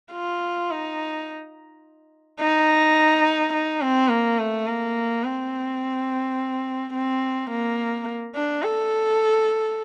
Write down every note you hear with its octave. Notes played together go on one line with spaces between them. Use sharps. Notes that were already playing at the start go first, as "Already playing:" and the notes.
F4
D#4
D#4
D#4
C4
A#3
A3
A#3
C4
C4
A#3
D4
A4